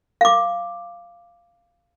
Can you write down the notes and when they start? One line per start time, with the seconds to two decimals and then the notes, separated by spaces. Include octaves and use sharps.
0.21 F5 D6